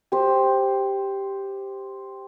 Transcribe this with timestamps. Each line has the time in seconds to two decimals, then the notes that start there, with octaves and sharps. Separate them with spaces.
0.12 G4 C5